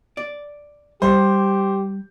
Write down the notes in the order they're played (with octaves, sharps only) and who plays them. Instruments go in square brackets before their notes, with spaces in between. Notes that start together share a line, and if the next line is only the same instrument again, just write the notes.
[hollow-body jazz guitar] D5
[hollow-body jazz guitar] G3 [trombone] G4 [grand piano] C5